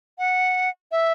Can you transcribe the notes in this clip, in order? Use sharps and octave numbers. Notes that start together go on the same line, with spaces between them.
F#5
E5